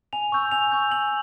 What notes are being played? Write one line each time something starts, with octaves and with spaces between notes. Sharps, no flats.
G#5 F7
C#6 E6 G6
G#5 F7
C#6 E6 G6
G#5 F#7